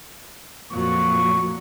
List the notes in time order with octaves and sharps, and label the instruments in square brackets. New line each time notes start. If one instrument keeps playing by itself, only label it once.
[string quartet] F2 A#2 F#3 [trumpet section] C#6